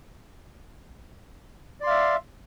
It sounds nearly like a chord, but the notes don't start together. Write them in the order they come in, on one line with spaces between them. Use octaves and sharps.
D5 C6 F5 E5